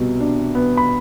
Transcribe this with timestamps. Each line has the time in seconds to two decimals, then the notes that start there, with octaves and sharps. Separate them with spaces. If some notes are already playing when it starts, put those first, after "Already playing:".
Already playing: C2 B2
0.20 D4
0.55 B3
0.77 B5